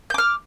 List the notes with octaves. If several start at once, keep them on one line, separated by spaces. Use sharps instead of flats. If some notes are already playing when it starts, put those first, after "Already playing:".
D6 F6 G6